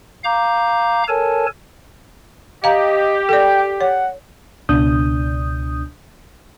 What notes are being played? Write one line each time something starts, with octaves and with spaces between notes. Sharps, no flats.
F5 A#5 D6 G6
A4 A#4 C#5 G#5 A5
G4 D#5 F5 A#5
A4 D5 G5
C#5 F#5
C#2 B2 D4 D#6 G6